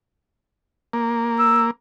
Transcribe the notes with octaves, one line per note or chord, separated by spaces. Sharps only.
A#3
E6